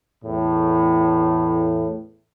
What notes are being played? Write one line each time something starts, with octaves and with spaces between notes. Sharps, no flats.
E2 A2